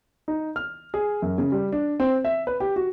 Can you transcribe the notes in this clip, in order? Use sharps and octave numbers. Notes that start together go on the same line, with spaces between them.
D#4
F6
G#4
F#2
C#3
G3
D4
C4
E5
B4
G4
F#4